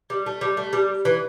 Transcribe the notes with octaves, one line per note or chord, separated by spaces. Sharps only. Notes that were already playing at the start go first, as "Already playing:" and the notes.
G3
A3
G3
A3
G3
E3